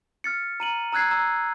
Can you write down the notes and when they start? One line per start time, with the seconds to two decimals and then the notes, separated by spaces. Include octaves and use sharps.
0.24 F6 A6 C#7
0.60 A#5 D#7 F#7
0.92 A#5 E6 F#6 G#6 C7
1.11 A#5 E6